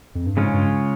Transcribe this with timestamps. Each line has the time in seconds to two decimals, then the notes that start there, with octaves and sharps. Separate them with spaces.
0.15 F2
0.26 G2
0.37 G#2 C#3 G#3 C#4 F4
0.53 G2